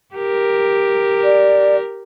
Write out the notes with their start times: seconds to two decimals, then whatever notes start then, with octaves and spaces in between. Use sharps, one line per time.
0.15 G4 A#4
1.24 D5